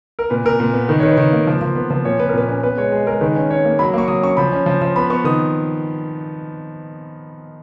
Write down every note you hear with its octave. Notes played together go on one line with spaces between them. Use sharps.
A#4
A#2 B4
A#2 A#4
A#2
B3
D#3 B4
D#3 C#5
B4
D#3
A#3
F3
F3
B3
F3
A#2 C#5
A#2 B4
A#4
A#2 B4
C#4
B3 B4
G#3 C#5
G#3
G#3 A#4
D#3 B4
C#4
C#4 C#5
A#3
F#3 B5
A#3 C#6
F#3 D#6
C#4 C#6
F3 B5
C#4
F3
F3
B3 B5
B3 C#6
D#3 D#6